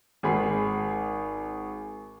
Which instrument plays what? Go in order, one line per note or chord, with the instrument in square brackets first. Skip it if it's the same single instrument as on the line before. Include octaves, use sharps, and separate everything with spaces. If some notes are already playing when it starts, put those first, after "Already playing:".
[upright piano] G#1 G#4 B5 C7